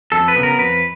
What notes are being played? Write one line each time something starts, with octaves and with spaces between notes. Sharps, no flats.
F2 A4
B4
C#3 F#3 B3
A#4
F2 B4